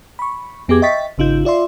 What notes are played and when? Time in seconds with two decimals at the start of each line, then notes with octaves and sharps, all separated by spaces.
0.19 B5 C#6
0.68 F2 B3 G4 G#4 D6 G#6
0.82 D#5 E5 G5 C#6 A6 B6
1.18 G#1 C#3 D#4 F4 G6
1.45 F4 D5 E5 C6